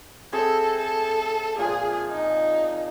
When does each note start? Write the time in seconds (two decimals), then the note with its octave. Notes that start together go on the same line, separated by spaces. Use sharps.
0.32 C4 G#4 A4 E5
0.77 A4
1.58 A#2 F3 G#4 G#5
2.10 D#4